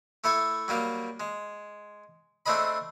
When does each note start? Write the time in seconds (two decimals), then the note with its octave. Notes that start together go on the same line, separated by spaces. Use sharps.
0.24 A3 E4 A4 G#5
0.68 F#3 G3 A#3 G4
1.20 G#3
2.46 A3 C4 D4 G#4 D#5 B5